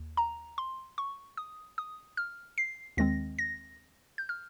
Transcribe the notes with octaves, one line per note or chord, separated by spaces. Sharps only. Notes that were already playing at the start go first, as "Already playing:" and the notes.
Already playing: D#2
A#5
C6
C#6
D#6
D#6
F6
C7
D#2 D#3 G#3 C4 A#6
A#6
G6
F6